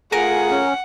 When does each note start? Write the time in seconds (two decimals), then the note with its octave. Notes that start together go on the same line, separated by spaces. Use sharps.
0.12 A3 F4 G#4 A#4 F#5 G#5 A#5
0.51 C#4